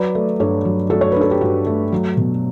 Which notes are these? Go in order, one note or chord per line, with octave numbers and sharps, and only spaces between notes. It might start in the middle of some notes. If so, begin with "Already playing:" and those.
Already playing: F#3 B4 D5
A3
G2 A4 C#5
F#3
A3 F#4 A4
C#5
D4 B4
A4
G4
G2 F#4
A3
F#3
B2